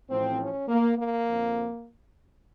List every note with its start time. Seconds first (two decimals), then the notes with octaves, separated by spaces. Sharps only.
0.10 A1 A2 F3 C4
0.39 C#4
0.68 A#3
0.97 A#3
1.25 F2 D3 F3